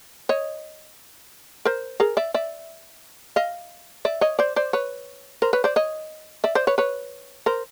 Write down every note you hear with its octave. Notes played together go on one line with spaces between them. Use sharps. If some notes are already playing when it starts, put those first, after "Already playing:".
C#5 D#5
A#4 C5
G#4 A#4
D5 E5
D5 E5
D#5 F5
D5 E5
C#5 D#5
C5 D5
C5 D5
B4 C#5
A#4 C5
B4 C#5
C5 D5
C#5 D#5
D5 E5
C5 D5
B4 C#5
B4 C#5
A#4 C5